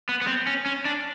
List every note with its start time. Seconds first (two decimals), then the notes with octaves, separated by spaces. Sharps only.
0.09 B3
0.21 B3
0.27 C4
0.47 C#4
0.66 C#4
0.85 D4